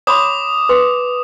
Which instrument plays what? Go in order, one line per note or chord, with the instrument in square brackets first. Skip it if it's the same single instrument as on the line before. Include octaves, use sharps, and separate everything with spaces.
[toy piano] C#5 B5 C6 [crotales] D6 D#6
[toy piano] B4 C6